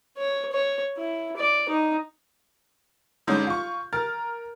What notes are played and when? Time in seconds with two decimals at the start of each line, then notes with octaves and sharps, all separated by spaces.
0.17 C#5
0.52 C#5
0.97 E4
1.37 D5
1.69 D#4
3.27 G1 D3 G#3 C#4 D#4 G6
3.47 F4 C#6
3.93 A#4 F6 A6